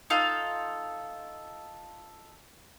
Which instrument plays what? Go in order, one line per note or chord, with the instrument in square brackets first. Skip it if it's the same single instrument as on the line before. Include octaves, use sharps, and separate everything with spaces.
[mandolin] D#4 F4 A4 F5